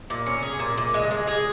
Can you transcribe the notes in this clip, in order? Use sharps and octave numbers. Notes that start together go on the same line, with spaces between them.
A#2
C#4
G#4
A#2
A#2
G#3
G#3
G#4